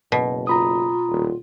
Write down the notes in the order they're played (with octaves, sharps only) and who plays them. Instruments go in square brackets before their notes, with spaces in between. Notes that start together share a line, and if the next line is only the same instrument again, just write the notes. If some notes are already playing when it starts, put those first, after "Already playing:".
[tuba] F#1 [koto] B2
[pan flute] F4 [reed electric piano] A#5 B5 D#6
[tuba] D#1